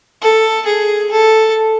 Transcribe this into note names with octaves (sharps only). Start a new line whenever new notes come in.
A4
G#4
A4